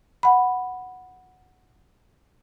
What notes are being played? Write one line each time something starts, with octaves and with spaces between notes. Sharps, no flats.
F#5 B5